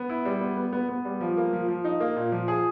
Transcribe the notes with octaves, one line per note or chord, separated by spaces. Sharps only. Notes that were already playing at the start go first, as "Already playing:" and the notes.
Already playing: B3
E4
G3
B3
B3
B3
B3
G3
F3
A#3
F3
F3
D#4
A#3
A#2
F3
G#4